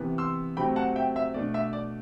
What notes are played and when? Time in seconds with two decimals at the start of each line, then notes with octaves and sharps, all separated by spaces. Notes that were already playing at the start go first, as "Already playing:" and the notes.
Already playing: C3 E3 B3
0.18 C6 E6
0.57 C3 F#3 A3 C4 G5 B5
0.76 F#5 A5
0.96 E5 G5
1.16 E5
1.34 B2 A3 D4 D5
1.54 E5
1.73 D5